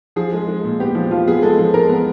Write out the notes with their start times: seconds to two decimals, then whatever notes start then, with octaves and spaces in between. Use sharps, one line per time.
0.16 F3 G#4
0.33 G#3
0.48 G#3
0.64 A#2
0.80 B3 G4
0.95 F3
1.11 F3 F4
1.27 B3 G#4
1.43 G#3 A4
1.59 F3
1.74 G#3 A#4
1.89 B3